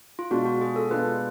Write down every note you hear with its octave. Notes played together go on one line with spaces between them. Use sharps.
F4
B2 G#3 D4 F4 F#4
F#4
G#4
A4
B2 G#3 D4 F4 B4